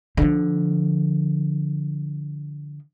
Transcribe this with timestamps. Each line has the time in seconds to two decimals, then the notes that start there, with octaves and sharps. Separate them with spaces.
0.17 D3 F3